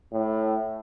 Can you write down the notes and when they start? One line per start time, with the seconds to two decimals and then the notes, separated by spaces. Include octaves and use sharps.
0.12 A2